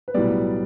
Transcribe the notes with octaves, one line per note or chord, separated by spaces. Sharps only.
B4
B1 A2 G3 B3 D5